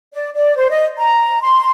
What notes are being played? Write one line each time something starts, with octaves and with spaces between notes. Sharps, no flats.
D5
D5
C5
D#5
A#5
C6